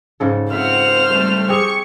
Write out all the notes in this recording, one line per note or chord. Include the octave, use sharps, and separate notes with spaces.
G#2 C#3 A4
C4 F4 C5 E5 F#5 F6
G3 A3 C4
C4 G4 G#4 C#6 C#7